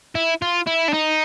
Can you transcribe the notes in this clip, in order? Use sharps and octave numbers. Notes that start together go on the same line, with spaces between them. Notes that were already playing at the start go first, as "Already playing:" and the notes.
E4
F4
E4
D4
D#4